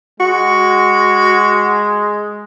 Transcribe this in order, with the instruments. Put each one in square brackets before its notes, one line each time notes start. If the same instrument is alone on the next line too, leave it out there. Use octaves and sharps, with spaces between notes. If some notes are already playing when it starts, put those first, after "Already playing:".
[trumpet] G#3 [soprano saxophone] F#4